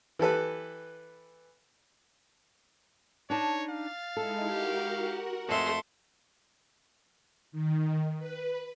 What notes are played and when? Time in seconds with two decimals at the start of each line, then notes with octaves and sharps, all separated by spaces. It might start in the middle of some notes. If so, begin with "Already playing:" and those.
0.19 E3 G4 A4 B4
3.30 D4 D#4 C#5 A5
3.70 F5 A6
4.17 G#3 D#4 E4 A4
4.49 F#4 G4 A#4 F#5
5.49 F2 G#3 A3 E5 C6
7.52 D#3
8.18 B4